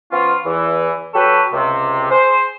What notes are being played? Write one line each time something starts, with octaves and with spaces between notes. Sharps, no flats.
F3 B3 C#4 F4
E2 E3
F#3 G4 A4 B4 C#5
C#2 C3
G#4 C5